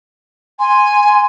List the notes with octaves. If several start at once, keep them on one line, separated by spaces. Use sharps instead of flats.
G#5 C6